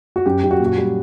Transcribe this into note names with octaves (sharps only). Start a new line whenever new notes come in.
F#4
F#2 G4
F#2 G4
F#4
A#2
F#4
G3